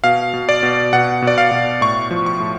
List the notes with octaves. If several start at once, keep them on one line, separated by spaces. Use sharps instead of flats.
B2 F5
B2
D5
B2
B2 F#5
B2
D5
F5
B2
A2 C#6
F3
C#6
A2